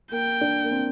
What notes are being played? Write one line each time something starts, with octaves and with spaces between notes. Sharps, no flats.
A#3 G5
D4
A#3
C4